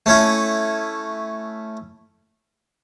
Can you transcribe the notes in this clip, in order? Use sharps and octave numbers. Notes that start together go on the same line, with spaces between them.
A3 C#4 E4